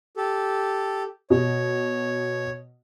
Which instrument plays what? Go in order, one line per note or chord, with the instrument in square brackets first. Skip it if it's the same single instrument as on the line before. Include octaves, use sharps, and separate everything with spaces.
[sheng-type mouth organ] G4 A4
[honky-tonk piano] B2 [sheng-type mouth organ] C#5